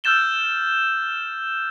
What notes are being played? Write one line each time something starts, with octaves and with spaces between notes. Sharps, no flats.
E6 F6 G6 A6 E7 G7